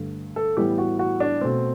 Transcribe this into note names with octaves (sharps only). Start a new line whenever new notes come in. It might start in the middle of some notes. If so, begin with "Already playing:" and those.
Already playing: G2 D3 A3
A4
A2 E3 G3 B3 G4
F#4
F#4
D4
B2 A3 C4